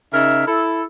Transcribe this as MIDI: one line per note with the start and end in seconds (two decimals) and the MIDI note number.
0.13 0.45 49
0.13 0.45 63
0.13 0.45 70
0.13 0.45 76
0.47 0.84 64
0.47 0.84 69